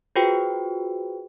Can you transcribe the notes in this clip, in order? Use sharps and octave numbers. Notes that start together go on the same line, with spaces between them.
F4 F#4 G#4 B4 C5 G5